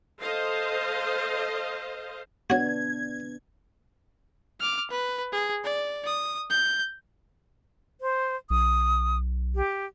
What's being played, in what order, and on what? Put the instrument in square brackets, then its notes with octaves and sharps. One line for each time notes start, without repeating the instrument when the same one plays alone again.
[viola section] A4 C5 D#5 F5
[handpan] B3 D4 [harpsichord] F#4 C#5 [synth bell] G#6
[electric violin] D6 F6
B4
G#4
D5
D#6
G6
[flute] C5
[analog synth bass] B1 [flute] D#6
[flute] G4